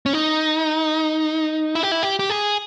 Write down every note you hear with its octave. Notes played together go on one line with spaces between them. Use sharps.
C#4
D#4
E4
G4
E4
G4
G4
G#4